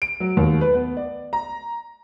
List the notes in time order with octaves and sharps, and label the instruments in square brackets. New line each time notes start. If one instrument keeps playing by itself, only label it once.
[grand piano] D7
F#3
D#2
B4
B3
D5
A#5